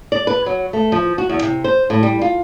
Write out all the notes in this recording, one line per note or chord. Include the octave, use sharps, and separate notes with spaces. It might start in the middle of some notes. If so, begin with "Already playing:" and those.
D5
B4
F#3
A3
F3
F#4
E2
C3
C5
A2
G3
F4